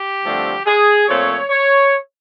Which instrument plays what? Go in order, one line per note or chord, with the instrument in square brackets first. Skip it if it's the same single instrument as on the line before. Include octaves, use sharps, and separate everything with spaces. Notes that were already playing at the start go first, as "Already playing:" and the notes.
Already playing: [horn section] G4
G2 D3 F3 A3 C4
G#4
A#2 F3 A3 C4 C#5
C#5